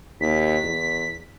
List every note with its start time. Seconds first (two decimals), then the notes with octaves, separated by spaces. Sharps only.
0.21 D#2 B6
0.64 E2